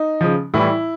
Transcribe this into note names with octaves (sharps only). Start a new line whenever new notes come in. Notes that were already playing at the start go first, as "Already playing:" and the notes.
Already playing: D#4
C#3 F3
A2 E3 G3 E4